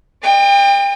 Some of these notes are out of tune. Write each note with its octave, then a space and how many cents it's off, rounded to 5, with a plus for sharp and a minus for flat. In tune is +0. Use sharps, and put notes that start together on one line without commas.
D#5 -45 G5 +30